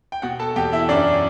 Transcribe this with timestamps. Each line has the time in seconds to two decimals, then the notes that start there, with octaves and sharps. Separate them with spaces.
0.12 G5
0.22 B2 F#4 F#5
0.39 A4 A5
0.56 E2 G4 G5
0.72 E4 E5
0.89 F#2 D4 D5